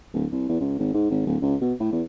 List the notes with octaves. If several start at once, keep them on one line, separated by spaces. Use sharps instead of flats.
D1
C2
E2
C#2
G#1
G#2
G#1
D1
C#2
B2
A2
E2